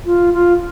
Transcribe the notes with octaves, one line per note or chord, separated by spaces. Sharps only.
F4
F4